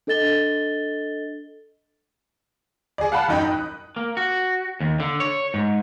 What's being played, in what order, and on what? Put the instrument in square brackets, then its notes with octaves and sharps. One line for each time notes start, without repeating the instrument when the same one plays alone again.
[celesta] D4 A4 D#5 A6 G7
[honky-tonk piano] G#4 D5
F5 F#5 A5 B5
A1 F#2 D#4 G5 B5
D#6 F#6
[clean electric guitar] A#3
F#4
D#2
D3
C#5
G#2